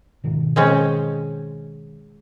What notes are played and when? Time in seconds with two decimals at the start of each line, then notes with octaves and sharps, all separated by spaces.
0.24 G#2 B2 D#3
0.56 G#3 C4 C#4